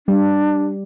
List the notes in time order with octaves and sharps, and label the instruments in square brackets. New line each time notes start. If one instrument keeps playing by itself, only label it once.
[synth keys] G3 [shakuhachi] D4